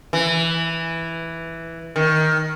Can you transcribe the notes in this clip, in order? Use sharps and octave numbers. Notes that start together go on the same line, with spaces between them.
E3
D#3